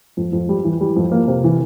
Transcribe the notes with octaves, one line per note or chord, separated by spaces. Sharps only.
F2
F2
G3
E3
G3
F2
A#3
C3
E3